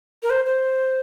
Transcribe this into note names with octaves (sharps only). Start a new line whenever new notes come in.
A#4
C5
C5